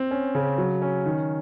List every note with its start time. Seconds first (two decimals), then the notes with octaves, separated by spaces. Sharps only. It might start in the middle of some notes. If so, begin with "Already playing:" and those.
Already playing: C4
0.11 C#4
0.35 C#3
0.58 F#3
0.82 C#4
1.06 D#3